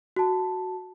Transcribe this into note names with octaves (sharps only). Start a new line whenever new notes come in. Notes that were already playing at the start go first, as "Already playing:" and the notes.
F#4 A5